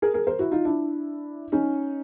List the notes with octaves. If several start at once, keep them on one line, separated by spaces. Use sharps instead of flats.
G#4 A#4
G#4 A#4
A#4 C5
E4 F#4
D#4 F4
D4 E4
C#4 D#4